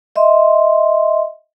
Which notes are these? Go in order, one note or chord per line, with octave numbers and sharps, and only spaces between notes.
D#5 E5 C6